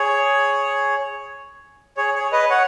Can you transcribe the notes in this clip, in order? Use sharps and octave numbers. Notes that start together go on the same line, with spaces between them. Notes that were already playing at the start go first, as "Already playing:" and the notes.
Already playing: G#4 C#5
G#4 C#5
G#4 C#5
B4 D#5
C#5 F#5